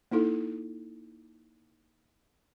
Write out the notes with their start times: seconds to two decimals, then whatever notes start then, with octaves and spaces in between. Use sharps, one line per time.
0.11 A#3 D#4 E4 A4